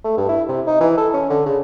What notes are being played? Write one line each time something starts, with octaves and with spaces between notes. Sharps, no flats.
A3
G2
E4
C3
D#4
E3
A4
C#4
D3
C#3